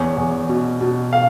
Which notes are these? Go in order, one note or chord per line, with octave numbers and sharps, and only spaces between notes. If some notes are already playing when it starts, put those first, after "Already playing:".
Already playing: E2 C#5
E2
B2
B2
F5